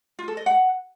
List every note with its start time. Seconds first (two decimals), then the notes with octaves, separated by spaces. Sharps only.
0.19 F4
0.28 A4
0.37 D#5
0.46 F#5